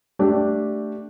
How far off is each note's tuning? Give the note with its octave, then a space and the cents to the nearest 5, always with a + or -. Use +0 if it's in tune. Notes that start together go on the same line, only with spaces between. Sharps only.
A3 +0 D4 +0 G4 -10